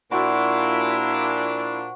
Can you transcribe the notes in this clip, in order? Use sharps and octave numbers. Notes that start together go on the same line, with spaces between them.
A#2 D4 E4 F#4 C5